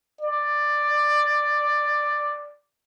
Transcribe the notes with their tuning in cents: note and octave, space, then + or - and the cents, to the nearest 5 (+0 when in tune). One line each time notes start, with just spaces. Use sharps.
D5 +10